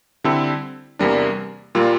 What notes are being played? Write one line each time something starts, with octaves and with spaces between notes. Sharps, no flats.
D3 G3 C4 E4 A4
E2 C3 G3 A#3 D4
A#2 G3 A#3 F4